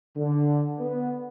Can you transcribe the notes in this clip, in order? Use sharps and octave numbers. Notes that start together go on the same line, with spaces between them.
D3
B3